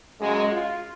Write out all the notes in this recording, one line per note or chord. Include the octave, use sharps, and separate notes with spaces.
F#2 C#3 G#3
F4